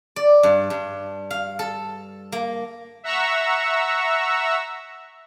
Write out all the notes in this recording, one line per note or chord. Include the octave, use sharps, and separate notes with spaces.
D5
G2
G2
F5
A4
A#3
E5 F#5 A#5 C#6 E6